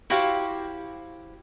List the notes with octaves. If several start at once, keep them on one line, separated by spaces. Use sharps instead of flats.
E4 F#4 G4 C5 F5